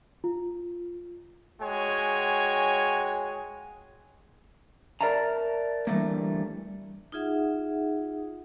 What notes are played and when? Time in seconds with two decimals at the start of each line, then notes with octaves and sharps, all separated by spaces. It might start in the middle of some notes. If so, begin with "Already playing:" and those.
0.24 F4
1.61 G#3 F#4 C#5 G5 G#5
5.01 A#4 D5 E5 A5 A#5
5.87 D3 E3 F3 G3 A3 A#3
7.12 D#4 F4 G#4 E5 F#5